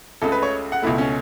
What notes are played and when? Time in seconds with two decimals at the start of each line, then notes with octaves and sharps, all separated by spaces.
0.22 C#2 C#3 A3 A4
0.32 B4
0.43 C#5
0.72 F#5
0.82 C#2 B2 A3 E4
0.98 C#4